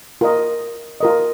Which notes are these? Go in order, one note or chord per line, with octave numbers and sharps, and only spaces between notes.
F4 A#4 D#5
F4 A#4 D#5